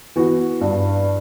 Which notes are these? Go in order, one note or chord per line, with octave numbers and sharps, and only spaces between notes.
E3 B3 F#4
G2